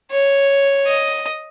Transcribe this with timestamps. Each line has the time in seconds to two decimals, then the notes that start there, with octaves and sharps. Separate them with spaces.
0.11 C#5
0.87 D#5